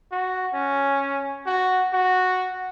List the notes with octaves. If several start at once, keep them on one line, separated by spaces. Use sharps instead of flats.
F#4
C#4
F#4
F#4